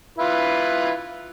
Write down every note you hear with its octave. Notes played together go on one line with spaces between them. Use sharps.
E4 F4 B4